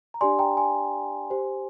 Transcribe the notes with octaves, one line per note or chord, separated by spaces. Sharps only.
A#5
D4 G4 D5 G#5 C6
G5 A#5
G#5 C6
G4 C5